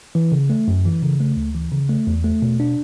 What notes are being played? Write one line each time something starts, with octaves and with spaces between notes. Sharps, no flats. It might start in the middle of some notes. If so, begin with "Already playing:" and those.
E3
C#3
A3
F#2
E3
C#3
A3
D2
E3
C#3
A3
E2
A3
B2
D4